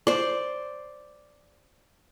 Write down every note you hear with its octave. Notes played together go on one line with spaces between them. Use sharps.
C5 D5